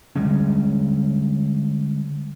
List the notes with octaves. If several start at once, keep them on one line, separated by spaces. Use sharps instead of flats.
D3 G3 G#3 C#4